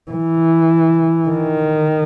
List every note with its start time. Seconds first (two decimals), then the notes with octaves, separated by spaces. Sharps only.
0.11 E3
1.28 D#3